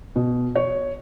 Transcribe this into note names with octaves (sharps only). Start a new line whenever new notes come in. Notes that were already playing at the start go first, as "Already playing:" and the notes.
B2
C#5